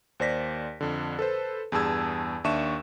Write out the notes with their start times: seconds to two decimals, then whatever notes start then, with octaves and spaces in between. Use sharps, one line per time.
0.20 D#2 C5 D5 A#6 B6
0.81 F2 D3
1.19 A4 B4 C5
1.72 E2 G2 G#4 A5 E6 G#6
2.44 D#2 D4 E5 C#6 D#7 E7